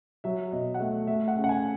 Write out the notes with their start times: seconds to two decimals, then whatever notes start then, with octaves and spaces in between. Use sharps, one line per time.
0.24 F#3 E5
0.52 B2 D#5
0.74 F#5
0.80 A3 E5
1.07 A3 E5
1.28 F#5
1.36 C#3
1.44 F#5
1.49 G#5